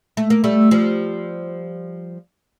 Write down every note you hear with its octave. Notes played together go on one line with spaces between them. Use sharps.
A3
A#3
G3 A3
F3 G3